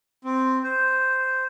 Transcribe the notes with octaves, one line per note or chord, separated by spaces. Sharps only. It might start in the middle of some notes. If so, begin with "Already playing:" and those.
C4
C5